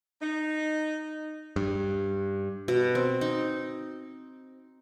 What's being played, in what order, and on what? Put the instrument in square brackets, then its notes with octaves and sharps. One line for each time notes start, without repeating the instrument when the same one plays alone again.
[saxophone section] D#4
[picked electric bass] G2
[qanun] B2
C4
D#4